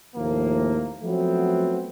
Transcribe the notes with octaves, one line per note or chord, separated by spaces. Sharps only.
D#2 A2 F3 A#3
F3 F#3 A3 B3 C4